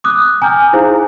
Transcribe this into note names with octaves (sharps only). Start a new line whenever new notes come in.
D6 D#6 F#6
G5 G#5 A#5 D6 F6 G6
D#4 E4 G#4 C5 F5